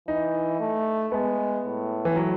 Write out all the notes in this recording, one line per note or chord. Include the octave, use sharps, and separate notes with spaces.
E3 D#4
A3
G#3 B3
A2
E3
F#3